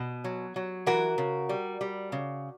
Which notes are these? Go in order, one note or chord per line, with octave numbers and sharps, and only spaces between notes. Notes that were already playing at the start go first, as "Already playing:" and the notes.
Already playing: B2
F#3
F#3
E3 F#4 A#4
C#3
G3
G3
C#3